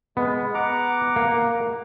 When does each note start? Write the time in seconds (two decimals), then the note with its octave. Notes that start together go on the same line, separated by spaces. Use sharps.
0.17 G#3 B3
0.54 F#5 A#5 D6
1.16 A#3